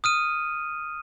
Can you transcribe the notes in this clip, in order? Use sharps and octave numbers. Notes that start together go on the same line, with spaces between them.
D#6 F6 D#7